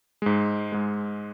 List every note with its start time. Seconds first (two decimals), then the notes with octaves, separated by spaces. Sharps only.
0.22 G#2 G#3
0.72 G#2 G#3